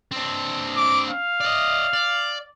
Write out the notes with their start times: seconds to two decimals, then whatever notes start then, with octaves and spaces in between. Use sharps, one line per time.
0.12 C4 D4
0.76 D6
1.09 F5
1.41 D5 D#5
1.93 D5